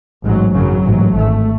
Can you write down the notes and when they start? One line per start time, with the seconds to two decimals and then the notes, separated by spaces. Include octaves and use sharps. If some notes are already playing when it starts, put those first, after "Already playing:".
0.24 A1 G#2 F#3
0.54 G#1 F#2 C#3 F#3
0.84 A1 G#2
1.13 G#1 G#2 A3